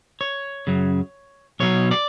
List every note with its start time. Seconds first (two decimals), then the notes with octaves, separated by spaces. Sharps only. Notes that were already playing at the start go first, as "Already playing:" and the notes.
0.21 C#5
0.67 F#2 C#3 F#3
1.60 B1 B2 F#3 C#5
1.91 D5